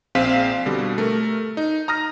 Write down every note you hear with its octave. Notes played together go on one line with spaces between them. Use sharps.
A#1 C4 G#4 F5 B6 D#7
B2 D3 G3
A3 A#4
D#4
A#5 D#6 F6 A#6